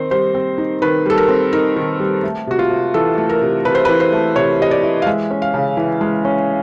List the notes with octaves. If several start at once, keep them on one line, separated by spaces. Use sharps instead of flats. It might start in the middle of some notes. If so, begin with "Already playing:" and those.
Already playing: D#3 C4 D#4 C5
G3 C5
C4
D#4
D#3 B4
G3 A4
A#4
C4
D#4 A#4
D#3
G3
A3
C3 F#4
F4
C3
E3 A4
A3
A#4
C3
C3 B4
C5
E3 B4
C5
A3
C3 C#5
C3 D#5
D5
E3
F5
G#3 E5
C#4
F5
C#3
E3
G#3
C#4